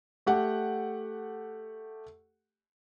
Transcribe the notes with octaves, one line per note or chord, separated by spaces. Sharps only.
A3 G4 F#5